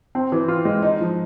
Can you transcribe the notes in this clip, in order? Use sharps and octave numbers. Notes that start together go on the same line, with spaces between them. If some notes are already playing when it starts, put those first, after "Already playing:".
C4
E3
F4
G#3
D#4
F3